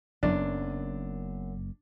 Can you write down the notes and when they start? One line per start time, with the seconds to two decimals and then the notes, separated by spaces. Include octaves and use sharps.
0.23 F#1 F#2 B3 D4